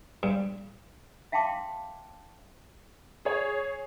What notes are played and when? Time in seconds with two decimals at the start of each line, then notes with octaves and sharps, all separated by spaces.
0.23 G2
1.32 E5 F5 G5 A5 C6 D6
3.25 G#4 C#5